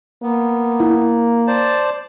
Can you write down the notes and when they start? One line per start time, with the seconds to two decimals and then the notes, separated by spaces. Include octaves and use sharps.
0.23 A#3 B3
0.80 E4
1.47 C5 D5 A5